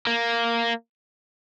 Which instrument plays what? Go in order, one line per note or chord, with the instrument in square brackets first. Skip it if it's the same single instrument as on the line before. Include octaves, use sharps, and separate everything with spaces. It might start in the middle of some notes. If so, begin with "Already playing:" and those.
[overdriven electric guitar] A#3